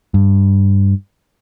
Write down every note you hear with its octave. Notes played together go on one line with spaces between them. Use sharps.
G2